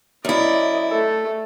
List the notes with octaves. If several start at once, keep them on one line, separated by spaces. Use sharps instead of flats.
F#2 E4 D5 D#5
A3 A4